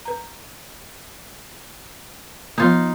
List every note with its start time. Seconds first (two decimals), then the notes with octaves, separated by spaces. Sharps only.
0.05 B4 A#5
2.58 F3 B3 D#4 F4